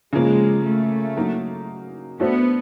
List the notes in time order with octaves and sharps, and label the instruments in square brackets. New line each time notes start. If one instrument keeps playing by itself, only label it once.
[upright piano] C#3 F3 A#3 [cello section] G#3
[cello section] A3
[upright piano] F#3 A#3 D#4
[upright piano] A3 D4 F#4 A4 C5 [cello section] B3